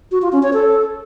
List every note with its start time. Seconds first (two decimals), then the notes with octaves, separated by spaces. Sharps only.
0.12 F#4
0.22 F4
0.32 C#4
0.43 C#5
0.53 A4